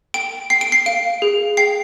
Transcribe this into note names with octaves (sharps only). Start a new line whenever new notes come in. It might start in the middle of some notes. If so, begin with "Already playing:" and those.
G5 D7
G5 C7
D7
C7
F5 D7
G#4
G5 C7